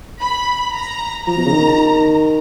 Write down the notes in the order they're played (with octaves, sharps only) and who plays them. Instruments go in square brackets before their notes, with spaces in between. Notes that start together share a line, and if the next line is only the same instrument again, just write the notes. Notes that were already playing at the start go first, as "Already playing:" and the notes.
[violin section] B5
A#5
[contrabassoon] F3 [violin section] A#5
[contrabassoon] B2
C#3
D#3